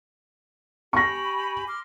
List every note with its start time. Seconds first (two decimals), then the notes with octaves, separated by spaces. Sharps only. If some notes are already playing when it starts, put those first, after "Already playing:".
0.93 G4 G#5 B5 C#6 A#6
1.68 C6 D6 F6